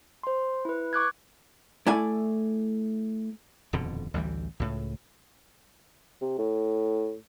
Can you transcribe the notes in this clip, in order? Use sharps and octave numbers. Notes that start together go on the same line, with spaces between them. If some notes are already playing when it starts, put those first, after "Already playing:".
C5 C6
E4 B4
C#6 D6 F#6 G#6
A3 E4 D5 G#5
D#1 F2 B2 D3
A1 D2 E3 G3
C#2 A2
C3
A2